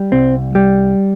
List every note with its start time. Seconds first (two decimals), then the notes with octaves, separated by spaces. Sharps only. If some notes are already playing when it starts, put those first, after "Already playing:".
Already playing: G3
0.12 C2 C4
0.55 G3